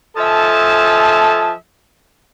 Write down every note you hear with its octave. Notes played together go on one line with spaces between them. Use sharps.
F3 A4 D#5 E5 G#5 A5